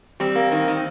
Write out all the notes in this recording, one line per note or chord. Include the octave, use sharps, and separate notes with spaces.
G3 C4
A#3
D#3
D#3